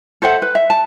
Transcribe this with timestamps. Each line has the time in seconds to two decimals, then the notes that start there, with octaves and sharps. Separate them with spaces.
0.22 A4 C5 E5 F#5
0.42 B4
0.55 E5
0.70 A5